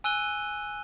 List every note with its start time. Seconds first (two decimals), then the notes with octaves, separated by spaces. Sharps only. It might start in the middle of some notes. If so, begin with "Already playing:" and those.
0.04 G#5 E6 F#6 D#7 G7